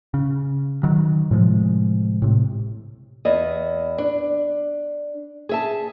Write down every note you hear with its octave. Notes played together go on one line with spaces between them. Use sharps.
C#3
D#3 F#3
A2 C3 F3 G#3
A2 C3
E2 D#5
D4
G#4 E5 A5